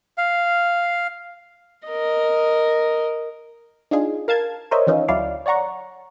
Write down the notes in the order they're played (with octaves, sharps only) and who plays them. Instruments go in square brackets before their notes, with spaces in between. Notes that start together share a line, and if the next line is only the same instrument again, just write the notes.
[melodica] F5
[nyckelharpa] A#4 D#5
[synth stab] D4 D#4 F4 G#4
A#4 F5 A5 G#6
A#4 C5 C#5 D#5 E5
D#3 E3 C#4 D#4 F4
D2 F#3 C#4 E4 D5 F5
C#5 D5 F#5 A#5 C#6